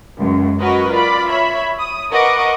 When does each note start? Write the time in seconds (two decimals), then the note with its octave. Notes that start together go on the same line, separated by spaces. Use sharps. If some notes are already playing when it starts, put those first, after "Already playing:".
0.17 C#2 F#2
0.59 F#4 A#4 B4 C#5 D#5
0.90 F4 D5 B5
1.27 C#5 E5 B5
1.79 D#6
2.11 A#4 B4 D#5 F#5 C#6 D6